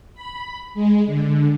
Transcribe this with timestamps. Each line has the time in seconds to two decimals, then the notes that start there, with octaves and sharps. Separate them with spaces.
0.15 B5
0.74 G#3
1.06 D3